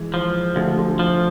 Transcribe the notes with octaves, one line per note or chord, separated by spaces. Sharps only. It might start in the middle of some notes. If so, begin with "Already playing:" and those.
Already playing: E3 G#3
F3
D2 F3 A3
D3 F3
F3